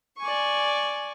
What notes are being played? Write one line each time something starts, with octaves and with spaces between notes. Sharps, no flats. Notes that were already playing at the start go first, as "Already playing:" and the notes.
D5 G#5 C#6